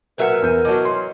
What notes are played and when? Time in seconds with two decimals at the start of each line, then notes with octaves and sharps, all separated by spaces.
0.18 A#2 F#3 A#4 B4 E5 F#5
0.42 E2 G6 D#7
0.65 E3 F#3 F#4 D#5 A5 D6
0.85 C6